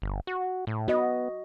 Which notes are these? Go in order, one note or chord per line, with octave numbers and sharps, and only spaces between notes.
G1
F#4
A2
B3 F#4 D#5